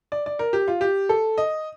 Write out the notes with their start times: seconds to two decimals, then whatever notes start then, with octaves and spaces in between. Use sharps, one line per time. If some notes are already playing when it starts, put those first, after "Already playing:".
0.12 D5
0.26 D5
0.39 A#4
0.53 G4
0.68 F4
0.81 G4
1.09 A4
1.38 D#5